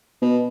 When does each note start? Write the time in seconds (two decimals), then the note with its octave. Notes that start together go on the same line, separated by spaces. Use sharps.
0.22 B2